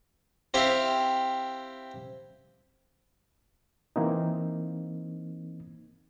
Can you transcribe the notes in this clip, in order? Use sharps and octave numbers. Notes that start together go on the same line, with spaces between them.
C4 E4 G4 F5
E3 A#3 C4 D#4